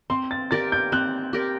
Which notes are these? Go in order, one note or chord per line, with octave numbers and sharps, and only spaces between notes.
C4 C6
A6
G4 A#4 D5 A6
G6
C4 F#6
G4 A#4 D5